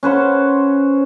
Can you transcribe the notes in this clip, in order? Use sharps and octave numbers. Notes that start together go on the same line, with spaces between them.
C#4 B4 C5 F#5